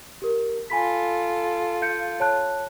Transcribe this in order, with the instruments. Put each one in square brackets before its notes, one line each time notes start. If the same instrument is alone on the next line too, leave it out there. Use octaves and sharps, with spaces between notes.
[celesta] G4 A#4
[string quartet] F4 A4 [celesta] G#5 B5 B6
[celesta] F5 G6 C#7
C#5 A5 F#6